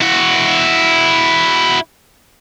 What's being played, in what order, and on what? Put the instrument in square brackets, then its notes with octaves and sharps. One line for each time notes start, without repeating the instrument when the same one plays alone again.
[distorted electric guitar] E4 F#4